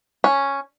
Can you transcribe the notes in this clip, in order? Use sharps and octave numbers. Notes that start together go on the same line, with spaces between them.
C#4